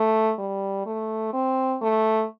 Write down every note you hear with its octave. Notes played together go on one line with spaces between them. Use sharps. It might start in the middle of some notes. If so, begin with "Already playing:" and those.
Already playing: A3
G3
A3
C4
A3